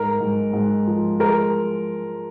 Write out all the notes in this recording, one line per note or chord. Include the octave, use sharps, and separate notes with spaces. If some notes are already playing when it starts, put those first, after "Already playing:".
Already playing: G#2 A#4
G#2
G#2
F3
G#3 A#4